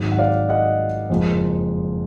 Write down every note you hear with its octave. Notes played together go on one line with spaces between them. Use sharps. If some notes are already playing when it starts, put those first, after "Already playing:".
Already playing: G#1 G#2 F#3
F#5
D5 F5
D#5 F#5
F#1 F2 F3 G#3